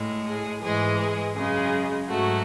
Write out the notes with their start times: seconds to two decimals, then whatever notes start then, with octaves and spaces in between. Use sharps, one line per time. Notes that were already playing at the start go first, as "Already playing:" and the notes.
Already playing: A2 G#3
0.26 G#4
0.62 G#2 E3 G#3 G#4
0.98 G#4
1.34 F#2 C#3 G#3 G#4
2.07 G#2 F#3 A3 F#4